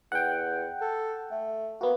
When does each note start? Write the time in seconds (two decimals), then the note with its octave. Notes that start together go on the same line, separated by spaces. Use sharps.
0.12 E2 F#5 G5
0.81 A4
1.31 A3
1.81 A#3 B3 F#4